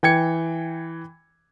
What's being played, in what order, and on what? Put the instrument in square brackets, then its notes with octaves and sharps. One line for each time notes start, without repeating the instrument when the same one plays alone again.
[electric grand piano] E3 G5 G#6 C#7